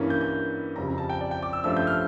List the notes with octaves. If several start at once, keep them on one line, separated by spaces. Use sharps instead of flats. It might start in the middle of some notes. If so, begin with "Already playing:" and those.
Already playing: G2 E3 A#3 C#4
G6
G6
F2 C#3 G3 C#4 A#5
A#5
A5
G5
D5
G5
D6
E6
G2 F3 A3 C#4 E6
G6
F6